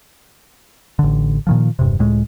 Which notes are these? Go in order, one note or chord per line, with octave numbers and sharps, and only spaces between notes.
A1 D3
A#2 D#3 F3
E1 G2 C3
C#2 A2 G#3